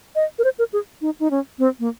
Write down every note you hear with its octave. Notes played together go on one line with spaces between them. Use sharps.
D#5
A#4
C5
A#4
G#4
D#4
D#4
C#4
C4
A#3